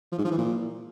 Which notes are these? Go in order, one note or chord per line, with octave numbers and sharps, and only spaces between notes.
F3
G#2
F3
E3
A#2